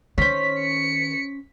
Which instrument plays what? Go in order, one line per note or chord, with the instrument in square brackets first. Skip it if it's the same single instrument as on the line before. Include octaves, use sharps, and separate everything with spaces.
[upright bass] D#3 [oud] C#4 C5 [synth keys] B6
[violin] C#7